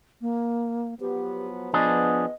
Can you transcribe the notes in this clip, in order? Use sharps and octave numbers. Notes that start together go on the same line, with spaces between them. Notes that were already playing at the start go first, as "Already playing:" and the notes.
A#3
F3 F#3 B3 G4
F3 B3 D4 G#4 D#5